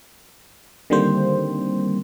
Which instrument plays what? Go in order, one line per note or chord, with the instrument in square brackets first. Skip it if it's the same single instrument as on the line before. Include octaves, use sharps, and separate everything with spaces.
[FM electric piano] D3 D#3 G3 A#3 C4 C5